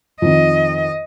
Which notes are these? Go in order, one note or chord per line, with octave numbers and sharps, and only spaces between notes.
F2 D#3 D#5